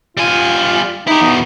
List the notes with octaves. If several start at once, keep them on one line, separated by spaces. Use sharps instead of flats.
G3 F4 G#5
D#4 E4 G4
E2 B2